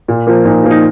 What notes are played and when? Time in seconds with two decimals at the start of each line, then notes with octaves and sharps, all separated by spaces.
0.08 A#2
0.27 F3 A#3
0.45 A#2 D#4
0.63 F3 A#3
0.71 D#4